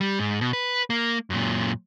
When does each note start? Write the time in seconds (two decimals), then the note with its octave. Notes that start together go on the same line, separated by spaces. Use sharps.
0.01 G3
0.19 G#2
0.41 B2
0.53 B4
0.90 A#3
1.30 F#2 A#2